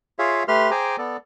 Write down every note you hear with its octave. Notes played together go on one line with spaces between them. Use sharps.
F4 G#4 C#5 E5 F5
A3 G4 B4 C6 F6
G#4 C5 G5 G#5 A#5 D6
B3 A4 D5